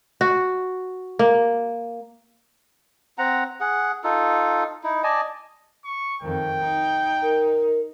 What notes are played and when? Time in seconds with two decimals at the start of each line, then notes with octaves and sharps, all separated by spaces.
0.21 F#4
1.19 A#3
3.18 C4 F#5 A#5
3.60 G#4 F#5
4.04 D#4 F4 A4
4.84 D#4 E4
5.03 D5 D#5 G#5 A5
5.85 C#6
6.22 F2 D#3 G5
6.62 D#4
7.22 A#4